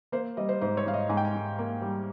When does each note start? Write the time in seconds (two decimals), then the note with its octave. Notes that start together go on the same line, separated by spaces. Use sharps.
0.12 A#3 C5
0.37 G3 D#5
0.49 C5
0.61 G#2 C5
0.77 C#5
0.86 G#2 F5
0.94 D#5
1.09 G#2 G#5
1.17 G5
1.25 G#5
1.34 G#2
1.59 A#3
1.82 G3